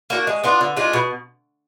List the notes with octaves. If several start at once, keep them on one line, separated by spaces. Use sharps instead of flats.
A#3 D4 F#4
G#3
B3 D4 F4
D3
G#3 D4 F4
B2